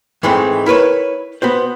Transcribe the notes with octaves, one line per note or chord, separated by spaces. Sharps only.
G#2 E3 G#3 A3 C4
E4 A#4 B4 C#5
B3 F#4 C5